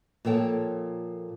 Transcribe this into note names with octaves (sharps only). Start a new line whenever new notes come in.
A#2 F3 A4 C#5 G5 A5